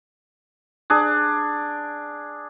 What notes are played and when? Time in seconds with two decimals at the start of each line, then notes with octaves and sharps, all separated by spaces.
0.90 D4 G#4